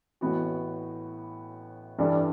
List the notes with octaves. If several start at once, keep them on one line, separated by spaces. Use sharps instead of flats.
A1 A2 E3 B3 F#4
G2 E3 G3 D4 A4